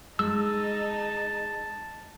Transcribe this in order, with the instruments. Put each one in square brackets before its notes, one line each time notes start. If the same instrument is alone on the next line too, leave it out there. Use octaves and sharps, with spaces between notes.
[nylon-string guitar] G#3 [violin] D#4 [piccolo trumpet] A5 [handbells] E6